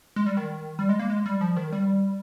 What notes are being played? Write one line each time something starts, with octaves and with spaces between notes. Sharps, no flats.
G#3
G3
D#3
G3
G#3
A#3
G#3
G3
F3
D#3
G3